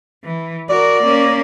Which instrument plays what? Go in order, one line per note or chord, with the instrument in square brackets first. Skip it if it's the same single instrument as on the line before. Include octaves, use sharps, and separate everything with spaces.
[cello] E3
[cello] F#4 A#4 [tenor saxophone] D5
[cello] A#3 C#4